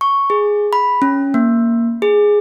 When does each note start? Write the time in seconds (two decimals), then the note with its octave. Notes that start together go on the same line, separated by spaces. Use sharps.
0.01 C#6
0.30 G#4
0.73 B5
1.02 C#4
1.34 A#3
2.02 G#4